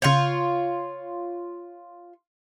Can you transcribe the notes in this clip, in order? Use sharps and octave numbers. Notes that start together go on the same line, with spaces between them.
C#3 F4 C#5 F5 G6